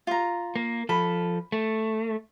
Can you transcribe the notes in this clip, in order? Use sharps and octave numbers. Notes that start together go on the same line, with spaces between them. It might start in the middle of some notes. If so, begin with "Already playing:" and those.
F4 A#5
A#3
F3 A4 B5
A3